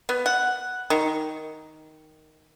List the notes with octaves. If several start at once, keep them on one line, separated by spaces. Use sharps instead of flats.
B3
F#5
D#3